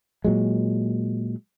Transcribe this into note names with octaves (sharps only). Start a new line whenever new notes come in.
A#2 F#3 G#3